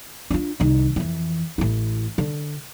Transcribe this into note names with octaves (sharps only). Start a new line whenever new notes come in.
D4 F4
C2 D#3
F2 E3
A1 E4
D3